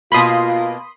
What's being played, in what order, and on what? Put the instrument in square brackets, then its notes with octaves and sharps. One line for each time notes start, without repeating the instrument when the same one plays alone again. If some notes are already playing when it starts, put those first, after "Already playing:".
[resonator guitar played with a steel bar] B2 A#3 [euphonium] F4 [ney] F5 [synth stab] B5 C6 D#6